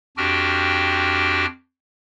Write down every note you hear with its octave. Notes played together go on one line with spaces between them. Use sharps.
F2 D4 F#4 G4 G5 F6